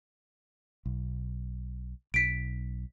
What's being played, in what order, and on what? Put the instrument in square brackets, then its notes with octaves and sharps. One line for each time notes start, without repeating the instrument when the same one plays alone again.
[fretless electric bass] B1
[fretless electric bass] B1 [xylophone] B6 D7